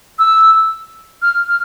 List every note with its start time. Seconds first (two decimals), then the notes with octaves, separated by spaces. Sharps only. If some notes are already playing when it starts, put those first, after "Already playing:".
0.19 E6
1.22 F6
1.48 F6